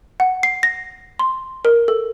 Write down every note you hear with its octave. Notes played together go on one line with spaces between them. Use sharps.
F#5
C7
A#6
C6
A#4
A4